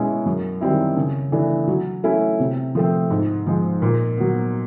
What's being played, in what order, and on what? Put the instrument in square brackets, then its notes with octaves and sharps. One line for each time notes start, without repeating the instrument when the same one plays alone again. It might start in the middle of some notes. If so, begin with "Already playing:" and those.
Already playing: [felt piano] B2 G#3 C#4 E4
F#2
D#3 G3 C4 E4
C#3
E3 A3 D4
F#3
A3 C#4 E4
C3
F3 A3 C4
G#2
F3 G#3
A#2
F#3 B3